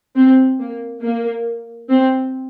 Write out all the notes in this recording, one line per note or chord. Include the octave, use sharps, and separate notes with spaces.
C4
A#3
A#3
C4